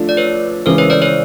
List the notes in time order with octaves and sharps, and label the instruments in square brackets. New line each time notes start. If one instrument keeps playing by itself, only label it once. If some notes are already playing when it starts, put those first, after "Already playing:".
Already playing: [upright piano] F3 A3 D4
[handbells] D5
B4 C#5
[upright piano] C#3 E3 G#3 [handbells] A#4 C5
[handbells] B4 C#5
C5 D5
B4 C#5